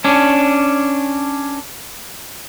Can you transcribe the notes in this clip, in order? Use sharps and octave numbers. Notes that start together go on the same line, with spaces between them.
C#4 D4